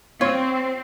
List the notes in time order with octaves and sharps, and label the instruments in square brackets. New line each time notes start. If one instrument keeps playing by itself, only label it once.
[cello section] C4 [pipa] F4 C#5